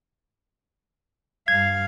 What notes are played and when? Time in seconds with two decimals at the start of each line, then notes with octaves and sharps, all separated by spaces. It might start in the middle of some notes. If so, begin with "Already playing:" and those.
1.48 G2 F5 G#6